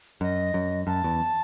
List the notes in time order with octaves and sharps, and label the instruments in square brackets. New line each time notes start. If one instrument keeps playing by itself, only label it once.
[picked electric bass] F#2 [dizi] D#5
[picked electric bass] F#2
[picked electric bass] F#2 [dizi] A5
[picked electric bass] E2